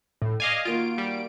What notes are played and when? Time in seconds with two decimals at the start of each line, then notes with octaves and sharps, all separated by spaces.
0.22 A2
0.40 D5 D#5 F5 G#5
0.65 D#3 A#3 F4 F#4 D7
0.98 G3